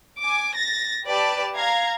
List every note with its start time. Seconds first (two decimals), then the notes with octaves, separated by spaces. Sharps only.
0.19 G#5 D6
0.55 A6 A#6
1.07 G4 B4 D5 A5
1.56 F5 A#5 G#6